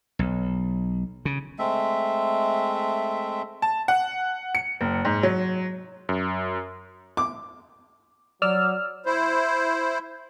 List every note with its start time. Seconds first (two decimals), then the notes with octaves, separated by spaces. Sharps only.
0.19 B1
1.25 C#3
1.59 G#3 A3 C4 E5
3.62 A5
3.88 F#5
4.55 C#7
4.81 F#1
5.05 G#2
5.23 F#3
6.09 F#2
7.17 D6
8.42 F#3 D5 E6 F6
9.06 E4 C5